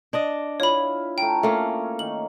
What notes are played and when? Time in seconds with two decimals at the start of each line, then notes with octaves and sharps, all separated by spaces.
0.13 D4 D5 D#5
0.60 E4 F4 C#5 B5
1.18 A3 G5 A#5
1.43 A3 A#3 C#4
1.99 D#3 F#7